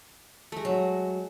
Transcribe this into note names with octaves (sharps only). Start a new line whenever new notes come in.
G#3 A3
F#3